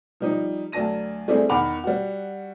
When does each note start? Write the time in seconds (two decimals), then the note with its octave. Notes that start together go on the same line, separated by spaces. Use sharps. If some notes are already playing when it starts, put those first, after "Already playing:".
0.20 F3 G3 D#4
0.72 D2 F#3 D4 A5 A#6 D#7
1.28 G3 A3 C4 D4 E4 G#4
1.49 E2 D#3 F#5 B5 D6 F7
1.84 G3 F#4